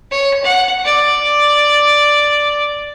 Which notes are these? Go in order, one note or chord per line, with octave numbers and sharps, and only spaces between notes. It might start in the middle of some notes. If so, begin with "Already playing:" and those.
C#5
F#5
D5